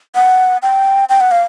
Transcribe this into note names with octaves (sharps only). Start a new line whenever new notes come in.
F#5
G5
G5
F#5
F5